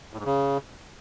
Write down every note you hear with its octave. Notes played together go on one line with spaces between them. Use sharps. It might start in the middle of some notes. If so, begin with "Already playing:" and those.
A2
G#2
C#3